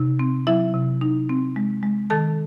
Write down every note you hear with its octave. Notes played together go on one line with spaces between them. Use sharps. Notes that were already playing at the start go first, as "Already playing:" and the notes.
Already playing: C3 D#4
C4
F#3 E4 E5
C3
D#4
C4
G#3
G#3
D#3 A4 A5